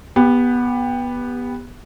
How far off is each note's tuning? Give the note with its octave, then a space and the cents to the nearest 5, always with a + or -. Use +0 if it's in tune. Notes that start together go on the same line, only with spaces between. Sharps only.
B3 -10 G4 +20